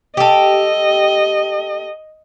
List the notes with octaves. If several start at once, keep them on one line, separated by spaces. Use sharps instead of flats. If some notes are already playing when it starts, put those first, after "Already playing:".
G4 A4 D#5